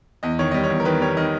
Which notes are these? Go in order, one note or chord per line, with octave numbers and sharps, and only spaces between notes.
E2 D#5
D#3 C#5
G3 D#5
C#5
E2
A#4
D#3 B4
G3 C#5
D#3 D#5